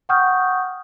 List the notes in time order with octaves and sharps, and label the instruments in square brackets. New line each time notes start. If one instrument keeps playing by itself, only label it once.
[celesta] F#5 G5 C#6 D#6 F6 G6